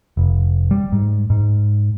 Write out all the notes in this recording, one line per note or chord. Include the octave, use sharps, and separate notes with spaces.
F1
G3
G#2
G#2